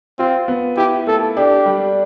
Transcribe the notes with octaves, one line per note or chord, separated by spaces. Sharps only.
C4 F4
B3
E4 G4
A3 A4
D4 G4
G3